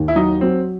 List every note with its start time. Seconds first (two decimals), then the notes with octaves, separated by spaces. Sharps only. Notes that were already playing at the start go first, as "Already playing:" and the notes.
Already playing: D#2
0.08 E4
0.15 F#3 D#4
0.41 F#3 C4